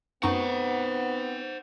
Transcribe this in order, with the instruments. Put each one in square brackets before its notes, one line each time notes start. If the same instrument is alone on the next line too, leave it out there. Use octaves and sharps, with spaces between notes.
[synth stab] F#2 D#4 C#6 [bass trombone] B3 [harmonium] C4 [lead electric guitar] C5 F#5